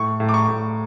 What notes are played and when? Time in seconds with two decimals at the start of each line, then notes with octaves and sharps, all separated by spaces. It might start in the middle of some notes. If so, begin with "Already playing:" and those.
Already playing: A2 C#6
0.20 A2
0.29 D6
0.34 C#6
0.48 A2